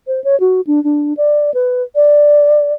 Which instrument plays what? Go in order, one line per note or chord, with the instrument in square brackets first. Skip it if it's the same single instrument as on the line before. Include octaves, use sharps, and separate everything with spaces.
[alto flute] C5
C#5
F#4
D4
D4
D5
B4
D5